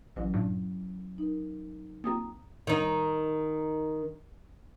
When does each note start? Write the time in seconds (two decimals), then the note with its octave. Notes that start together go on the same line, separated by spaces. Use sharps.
0.16 A1 F#3 C#4 E4
0.34 G2 A#2
1.18 D#4 A#4
2.04 A#3 C4 F4 A#5 D#6
2.67 D#3 D#4